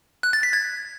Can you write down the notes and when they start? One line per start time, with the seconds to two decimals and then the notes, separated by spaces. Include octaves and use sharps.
0.23 F#6
0.33 A6
0.43 B6
0.53 G#6